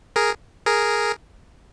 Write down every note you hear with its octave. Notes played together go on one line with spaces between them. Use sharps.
G#4 A#4
G#4 A#4